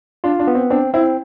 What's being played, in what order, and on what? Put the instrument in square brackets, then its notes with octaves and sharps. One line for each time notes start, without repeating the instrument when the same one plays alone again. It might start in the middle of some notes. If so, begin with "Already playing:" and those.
[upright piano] D4 [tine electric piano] F4
[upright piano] D4
[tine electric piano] B3
[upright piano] C4
[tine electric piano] C4 [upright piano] D4
[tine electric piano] C4 [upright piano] E4